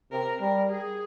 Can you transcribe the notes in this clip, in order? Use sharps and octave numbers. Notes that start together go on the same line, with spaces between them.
C3 A#4
G3 A#4
G#4